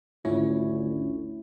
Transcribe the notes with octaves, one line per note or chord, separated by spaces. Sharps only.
G#1 D2 C#4 E4 F4 C#5